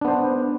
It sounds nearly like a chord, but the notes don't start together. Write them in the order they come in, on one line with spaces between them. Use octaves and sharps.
D4 B3 C5